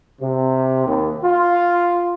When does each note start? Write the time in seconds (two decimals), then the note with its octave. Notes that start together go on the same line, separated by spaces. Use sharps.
0.21 C3
0.86 D#2
1.24 F4